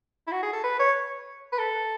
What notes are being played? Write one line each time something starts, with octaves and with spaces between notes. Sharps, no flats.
E4
F#4
G#4
A4
B4
C#5
B4
A4